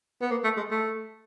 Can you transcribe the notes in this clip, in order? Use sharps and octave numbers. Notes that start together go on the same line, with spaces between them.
B3
A#3
A3
G#3
A3